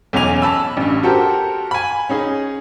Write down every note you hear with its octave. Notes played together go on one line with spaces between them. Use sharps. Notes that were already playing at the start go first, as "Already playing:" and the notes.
B1 E2 C#4 G#5 F7
A5 B5 E6
A1 G2
F#4 G4 A4 A#4 C5
G#5 B5
C#4 D#4 G#4